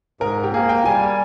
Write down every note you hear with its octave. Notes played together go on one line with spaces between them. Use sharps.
G#2 A#4
G4
A#3 G#4
G5
G3 G#5